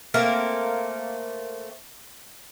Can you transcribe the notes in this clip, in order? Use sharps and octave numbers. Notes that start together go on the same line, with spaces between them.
A3 A#3 C4 A#4